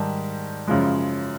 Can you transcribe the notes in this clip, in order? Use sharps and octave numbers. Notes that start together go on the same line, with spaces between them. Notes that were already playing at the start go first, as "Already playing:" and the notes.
Already playing: G#2 D#3 G3 A5
F#2 C#3 F3 G#3